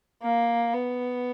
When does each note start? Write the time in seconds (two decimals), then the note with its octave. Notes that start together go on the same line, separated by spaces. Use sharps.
0.23 A#3
0.74 B3